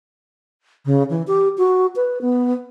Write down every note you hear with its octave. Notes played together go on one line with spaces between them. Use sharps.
C#3
E3
G4
F#4
B4
B3